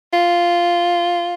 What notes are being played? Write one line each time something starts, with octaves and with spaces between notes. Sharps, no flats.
F4